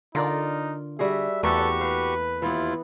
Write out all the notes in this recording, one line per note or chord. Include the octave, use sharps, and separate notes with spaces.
D3 D#4 F4 A#4 D5
G3 F#4 G#4 E5
E2 A3 A#3 F#4 G4 A4 B4 C#6
B4 F5
D#2 E3 B3 E4 F4